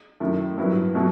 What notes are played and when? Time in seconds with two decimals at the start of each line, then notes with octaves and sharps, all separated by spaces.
0.20 F#2 D#3 A3 E4
0.58 G2 F#3 B3 E4
0.95 B2 F#3 A3